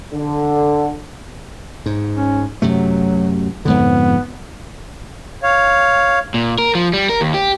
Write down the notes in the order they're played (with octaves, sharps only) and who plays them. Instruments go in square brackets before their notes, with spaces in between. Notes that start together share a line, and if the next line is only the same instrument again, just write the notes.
[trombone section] D3
[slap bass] G#2
[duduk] C#4
[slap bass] F#2 C3 A3 [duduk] F#3
[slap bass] F2 G#2 D3 [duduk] B3
[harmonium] C#5 F5
[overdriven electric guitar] A#2
A#4
F3
G3
A#4
D#2
G4